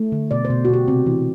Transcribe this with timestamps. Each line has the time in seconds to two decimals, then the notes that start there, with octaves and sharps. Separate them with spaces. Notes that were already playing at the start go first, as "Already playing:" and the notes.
Already playing: A3
0.12 D3
0.31 B2 D5
0.45 C5
0.50 B2
0.65 F#4
0.69 B2 G4
0.88 C3 C4
1.06 E3